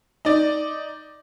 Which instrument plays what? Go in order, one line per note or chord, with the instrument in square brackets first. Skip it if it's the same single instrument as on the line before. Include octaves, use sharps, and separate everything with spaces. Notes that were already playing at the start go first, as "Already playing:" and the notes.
[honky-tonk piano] D#4 D5